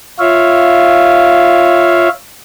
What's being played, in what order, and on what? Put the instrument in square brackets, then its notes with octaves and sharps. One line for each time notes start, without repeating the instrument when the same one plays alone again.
[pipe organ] F4 C#5 E5 F5